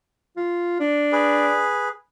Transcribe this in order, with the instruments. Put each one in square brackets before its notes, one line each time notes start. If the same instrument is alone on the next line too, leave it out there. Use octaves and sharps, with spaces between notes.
[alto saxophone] F4
D4
[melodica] G#4 B4